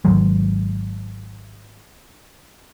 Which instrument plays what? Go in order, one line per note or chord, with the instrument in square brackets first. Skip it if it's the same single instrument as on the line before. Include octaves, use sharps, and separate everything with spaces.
[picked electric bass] G#1 D#3 F#3 G#3